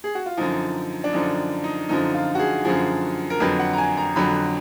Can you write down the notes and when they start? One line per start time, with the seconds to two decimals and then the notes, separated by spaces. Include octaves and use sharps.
0.04 G#4
0.15 F#4
0.26 F4
0.37 F#2 D3 F3 D#4
1.04 D4
1.13 F#2 D3 F3 D#4
1.64 D#4
1.89 F#2 D3 F3 D#4
2.14 F4
2.35 F#4
2.39 G#4
2.65 F#2 D3 F3 G#4
3.30 A#4
3.40 F2 D3 F#3 B4
3.59 F#5
3.73 A#5
3.78 G#5
3.97 A#5
4.16 F2 D3 F#3 B5